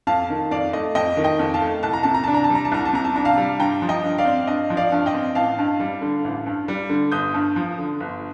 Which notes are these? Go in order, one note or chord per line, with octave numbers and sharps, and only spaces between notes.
F2 F5 A5
D#3
F2 D5 F5
A3 D#5
F2 D#5 G5
D#3
D#5 G5
F2
F5 A5
A3
C2 A5
A#5
C3 A5
A#5
D4 A5
A#5
A5
G3 A#5
A5
C2 A#5
A5
C3 A#5
A5
D4 A#5
F5 A5
G3
G2 G5 A#5
F3
D#5 G5
G2
D5 F5
C4
G2 D#5
F3
D5 F5
G2
D#5 G5
C4
A1 F5 A5
G2
G3
D3
A1
G2
G3
D3
G1 D#6 G6
G2
F3
D3
G1